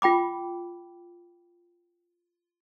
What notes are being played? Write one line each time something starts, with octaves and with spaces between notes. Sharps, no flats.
F4 G5 B5 D6